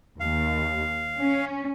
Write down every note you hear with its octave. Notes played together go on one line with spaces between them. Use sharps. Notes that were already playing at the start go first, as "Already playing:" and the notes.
D#2 F5
C#4